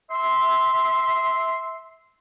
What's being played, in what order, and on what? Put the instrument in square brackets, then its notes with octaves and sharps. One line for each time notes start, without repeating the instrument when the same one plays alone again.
[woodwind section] E5 C6